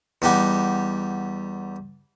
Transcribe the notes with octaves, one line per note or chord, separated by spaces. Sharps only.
E2 G3 D#4 G4 F#5 G#5